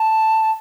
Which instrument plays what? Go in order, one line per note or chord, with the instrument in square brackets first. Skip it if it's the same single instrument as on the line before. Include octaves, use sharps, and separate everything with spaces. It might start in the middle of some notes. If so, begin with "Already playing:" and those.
Already playing: [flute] A5